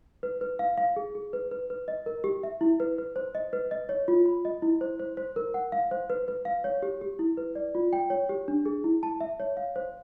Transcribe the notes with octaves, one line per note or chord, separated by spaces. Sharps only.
B4
B4
F5
F5
G#4
G#4
B4
B4
B4
D#5
A#4
G4
E5
E4
B4
B4
C5
D#5
B4
D#5
C#5
F4
B5
D#5
E4
C5
C5
C5
A#4
F#5
F5
C5
B4
B4
F5
C#5
G4
G4
E4
B4
D5
F4
G5
C#5
G4
D4
G#4
E4
A5
E5
C#5
F5
C5